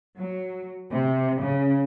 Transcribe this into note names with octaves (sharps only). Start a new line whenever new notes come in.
F#3
C3
C#3